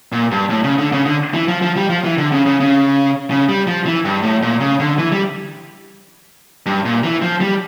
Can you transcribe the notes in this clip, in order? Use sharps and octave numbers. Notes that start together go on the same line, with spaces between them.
A#2
G2
A2
C#3
D3
C#3
D3
E3
F3
F3
G3
F3
E3
D3
C#3
C#3
C#3
C#3
G3
F3
E3
G2
A2
A#2
C#3
D3
E3
G3
G2
A#2
E3
F3
G3